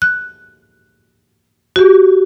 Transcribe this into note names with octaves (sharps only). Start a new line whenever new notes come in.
F#6
F#4 G4